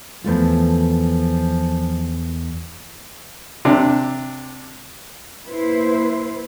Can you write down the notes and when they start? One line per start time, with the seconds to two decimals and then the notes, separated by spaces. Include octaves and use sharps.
0.24 E2 F3 A3 F4
3.65 C3 D4
5.46 A#3 E4 B4 C5